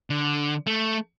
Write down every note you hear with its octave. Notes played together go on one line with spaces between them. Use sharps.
D3
A3